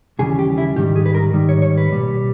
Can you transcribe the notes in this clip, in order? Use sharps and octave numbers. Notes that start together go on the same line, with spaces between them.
D#2 C#3 E3 G3 G#4
G4
E4
G#2 D#3 G3 G4
G#4
B4
A#4
G#2 D#3 G3
C#5
C#5
B4
B1 A#2 G3